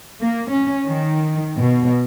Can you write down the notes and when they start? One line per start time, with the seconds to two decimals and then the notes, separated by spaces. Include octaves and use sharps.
0.21 A#3
0.51 C#4
0.87 D#3
1.59 B2